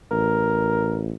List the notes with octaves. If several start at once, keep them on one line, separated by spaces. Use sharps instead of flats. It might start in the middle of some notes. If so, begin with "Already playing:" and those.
A1 A#4